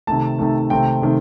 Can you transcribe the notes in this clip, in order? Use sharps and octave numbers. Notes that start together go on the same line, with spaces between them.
C3 D#3 A3 A5
C3 D#3 A3
C3 D#3 A3 C4 G5
C3 D#3 A3 C4